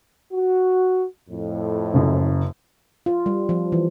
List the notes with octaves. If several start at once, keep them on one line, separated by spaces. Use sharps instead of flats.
F#4
F2 A2
F#1 F#2
F4
G3
F3
E3